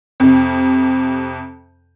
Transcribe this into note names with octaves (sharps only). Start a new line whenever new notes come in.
F2 C3